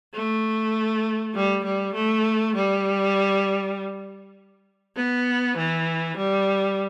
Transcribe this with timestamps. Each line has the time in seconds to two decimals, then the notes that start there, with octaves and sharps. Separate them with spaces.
0.14 A3
1.35 G3
1.64 G3
1.95 A3
2.55 G3
4.96 B3
5.57 E3
6.17 G3